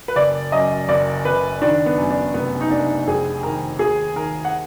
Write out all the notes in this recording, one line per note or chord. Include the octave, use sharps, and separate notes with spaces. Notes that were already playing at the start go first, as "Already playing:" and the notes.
B4
F#1 D5
F#2 D#5
F#1 D5
F#1 B4
D#3 D4
B3
F#2
D4
F1 B3
D#4
F1 D4
F2 G#4
D#3 A#4
D#2 G#4
D#3 A#4
F#5